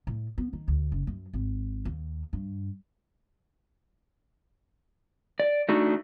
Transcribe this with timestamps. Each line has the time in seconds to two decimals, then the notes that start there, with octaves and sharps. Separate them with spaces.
0.07 A2
0.38 B3
0.53 D#3
0.68 D2
0.92 F#1
1.07 F#2
1.33 G#1
1.85 D#2
2.33 G2
5.40 D5
5.69 A3 D4 D#4 F#4